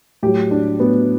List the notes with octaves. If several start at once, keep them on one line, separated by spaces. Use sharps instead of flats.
A2 F#3 G4
D4
A2 F#3 B3